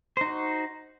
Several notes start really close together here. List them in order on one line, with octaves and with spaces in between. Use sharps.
C5 D#4 F#4